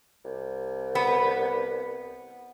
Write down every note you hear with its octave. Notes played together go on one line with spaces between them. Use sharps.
C2
B3